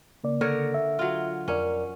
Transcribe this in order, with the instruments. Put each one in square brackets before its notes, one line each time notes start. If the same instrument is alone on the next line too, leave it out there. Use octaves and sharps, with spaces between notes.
[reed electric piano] C#3 A#3 D5
[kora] D3 A#4 C#5
[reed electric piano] E5
[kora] F#3 F4
[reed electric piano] F2 A#4 D5 [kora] C#4